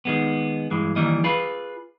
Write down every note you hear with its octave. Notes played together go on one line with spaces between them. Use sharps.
D#3 G#3 B3
G2 E3 G#3
D#3 E3 G3 A#3 D#5
F4 G#4 B4